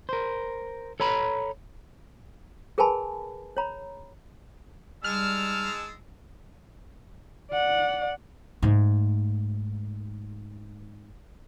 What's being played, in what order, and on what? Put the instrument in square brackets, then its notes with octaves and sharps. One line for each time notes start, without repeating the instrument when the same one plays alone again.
[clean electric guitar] A#4 C5
A4 C#5 A#5 B5
[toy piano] G#4 A#4 B4 G#5 A5 B5
C#5 A#5 B5
[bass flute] G3 [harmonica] G#3 D#4 A5 [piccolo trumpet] E6 [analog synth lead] F6
[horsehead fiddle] D5 F#5
[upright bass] G#2 A3